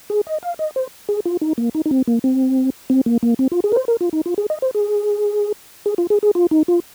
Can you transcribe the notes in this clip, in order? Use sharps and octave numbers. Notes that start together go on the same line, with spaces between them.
G#4
D#5
F5
D#5
C5
G#4
F4
D#4
A#3
D#4
D#4
C4
A#3
C4
C4
A#3
A#3
C4
F4
G#4
A#4
C5
A#4
F4
D#4
F4
G#4
D#5
C5
G#4
G#4
F4
G#4
G#4
F4
D#4
F4